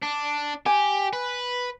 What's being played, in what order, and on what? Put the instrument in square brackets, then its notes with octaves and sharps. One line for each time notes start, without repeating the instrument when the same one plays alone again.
[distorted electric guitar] D4
[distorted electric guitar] G4 [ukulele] G#5
[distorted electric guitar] B4